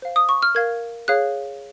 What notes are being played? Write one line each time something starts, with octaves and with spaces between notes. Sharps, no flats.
C5 F5
D#6
C#6
F6
A#4 F5 G#6
G#4 C#5 F5 F#6